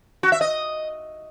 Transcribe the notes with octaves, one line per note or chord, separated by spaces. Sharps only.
F#4
E5
D#5